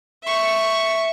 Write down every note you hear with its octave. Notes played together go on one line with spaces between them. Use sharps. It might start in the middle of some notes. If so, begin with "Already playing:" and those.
E5 C#6